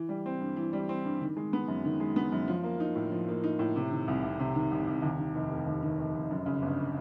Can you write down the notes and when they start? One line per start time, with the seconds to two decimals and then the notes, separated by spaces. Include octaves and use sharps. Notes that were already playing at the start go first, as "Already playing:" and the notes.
Already playing: E3
0.09 G3
0.26 C4
0.41 G2
0.56 E3
0.73 G3
0.89 C4
1.05 G2
1.21 D#3
1.37 G#3
1.53 B3
1.68 F#2
1.85 D#3
2.00 G#3
2.16 B3
2.32 F#2
2.48 F3
2.64 A#3
2.80 D#4
2.95 A2
3.12 F3
3.28 A#3
3.44 D#4
3.59 A2
3.76 C3
3.91 D#3
4.08 C2
4.23 C2
4.40 C3
4.55 D#3
4.71 C2
4.87 C2
5.02 D#2
5.19 D#3
5.35 F1
5.50 F1
5.67 D#2
5.83 D#3
5.99 F1
6.14 F1
6.31 F#2
6.46 C#3
6.62 G1